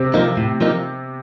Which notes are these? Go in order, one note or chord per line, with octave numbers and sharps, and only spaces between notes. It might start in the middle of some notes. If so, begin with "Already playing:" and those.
Already playing: C3 C4
F3 A#3 D#4
A2
F3 A#3 D#4